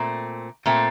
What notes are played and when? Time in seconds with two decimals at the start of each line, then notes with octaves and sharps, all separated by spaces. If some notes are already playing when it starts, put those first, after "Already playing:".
Already playing: A#2 A3 C4
0.66 A#2 A3 C4